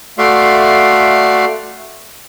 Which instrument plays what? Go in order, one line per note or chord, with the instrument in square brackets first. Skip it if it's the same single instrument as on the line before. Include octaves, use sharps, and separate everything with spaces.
[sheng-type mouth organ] A3 F#4 D5 E5 F5 C6